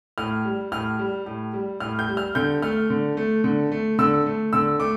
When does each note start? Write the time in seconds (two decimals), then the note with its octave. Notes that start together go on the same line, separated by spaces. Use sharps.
0.18 A2 F6
0.45 G3
0.72 A2 F6
0.99 G3
1.26 A2
1.53 G3
1.80 A2 F6
1.99 G6
2.09 G3
2.17 F6
2.35 D3 G6
2.62 A3 F6
2.90 D3
3.17 A3
3.44 D3
3.72 A3
3.99 D3 E6
4.26 A3
4.53 D3 E6
4.80 A3 D6